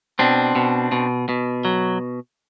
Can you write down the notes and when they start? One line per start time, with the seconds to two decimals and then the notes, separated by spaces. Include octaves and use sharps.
0.19 B2 C4 D4
0.56 B2
0.92 B2
1.29 B2
1.65 F#3